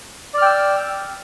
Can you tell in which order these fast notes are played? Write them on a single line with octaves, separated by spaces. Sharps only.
D5 F6 G5 E6